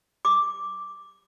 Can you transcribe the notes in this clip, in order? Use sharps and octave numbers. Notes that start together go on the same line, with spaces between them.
D6